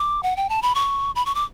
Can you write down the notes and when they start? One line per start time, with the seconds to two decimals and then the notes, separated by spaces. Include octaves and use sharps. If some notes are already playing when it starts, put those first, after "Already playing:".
Already playing: D6
0.23 F#5
0.37 G5
0.49 A5
0.62 B5
0.75 C#6
1.15 B5
1.26 C#6
1.35 D6